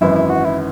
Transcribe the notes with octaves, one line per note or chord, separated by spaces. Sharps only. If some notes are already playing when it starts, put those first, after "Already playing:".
G#1 F#2 E3 E4
E4
F#4
E4